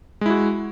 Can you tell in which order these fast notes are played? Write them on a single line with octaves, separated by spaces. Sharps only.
G#3 E4 F#4